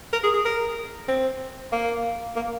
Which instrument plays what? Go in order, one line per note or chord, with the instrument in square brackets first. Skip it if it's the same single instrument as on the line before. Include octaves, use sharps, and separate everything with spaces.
[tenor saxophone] A#4
G#4
G#4
A#4
C4
A#3
A#3